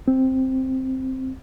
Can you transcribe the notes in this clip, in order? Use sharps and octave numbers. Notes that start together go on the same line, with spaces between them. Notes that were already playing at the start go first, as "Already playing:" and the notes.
C4